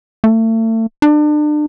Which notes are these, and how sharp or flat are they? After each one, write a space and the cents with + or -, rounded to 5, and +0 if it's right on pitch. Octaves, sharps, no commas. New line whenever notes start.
A3 +35
D4 +35